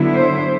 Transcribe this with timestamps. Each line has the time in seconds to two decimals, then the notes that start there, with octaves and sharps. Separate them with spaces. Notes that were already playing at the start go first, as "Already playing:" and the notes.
Already playing: D3 F#3 B3 E4
0.12 C5